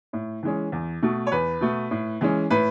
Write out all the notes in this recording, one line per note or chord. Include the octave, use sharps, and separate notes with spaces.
A2
E3 G#3 C#4
E2
B2 A3
C#5
E2 B4
B2 A3
A2
E3 G#3 C#4
A2 B4